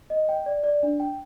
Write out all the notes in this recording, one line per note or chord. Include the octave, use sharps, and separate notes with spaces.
D#5
G5
D5
D5
D4
G5